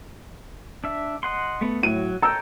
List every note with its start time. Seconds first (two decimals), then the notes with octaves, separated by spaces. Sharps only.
0.84 D4 E5
1.23 D#5 F#5 C6
1.61 A3 B3
1.83 A2 F#3 D#7
2.22 A4 C#5 G5 A#5 E6